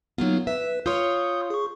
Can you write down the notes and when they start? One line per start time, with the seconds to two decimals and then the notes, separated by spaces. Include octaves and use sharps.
0.18 F#3 A#3 B3 D#4 F4
0.47 B4 E5
0.86 F4 C#5 C6 D#6 G6
1.50 G#4 C#6